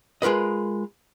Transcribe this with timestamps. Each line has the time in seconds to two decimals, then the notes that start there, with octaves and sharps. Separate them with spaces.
0.22 G#3 F4 A#4 B4 D#5